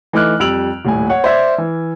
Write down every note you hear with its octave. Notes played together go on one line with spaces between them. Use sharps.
E3 A3 D#4 D6 F6 F#6
F2 G3 E6 D7 F7 F#7
D#1 A2 G#5
C#5 F#5
C5 D5 E5 G#6
E3